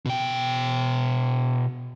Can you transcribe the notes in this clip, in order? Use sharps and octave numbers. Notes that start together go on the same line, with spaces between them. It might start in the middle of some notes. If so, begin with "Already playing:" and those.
B2 G5